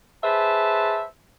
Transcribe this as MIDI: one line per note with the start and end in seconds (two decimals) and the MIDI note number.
0.23 1.04 68
0.23 1.04 71
0.23 1.04 72
0.23 1.04 76
0.23 1.04 81